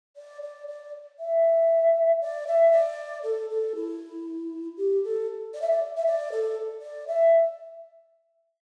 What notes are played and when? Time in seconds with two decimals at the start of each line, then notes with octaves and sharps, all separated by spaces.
0.16 D5
0.42 D5
0.67 D5
1.19 E5
2.21 D5
2.47 E5
2.72 D5
3.23 A4
3.50 A4
3.75 E4
4.77 G4
5.04 A4
5.54 D5
5.61 E5
5.70 D5
5.97 E5
6.06 D5
6.32 A4
6.82 D5
7.07 E5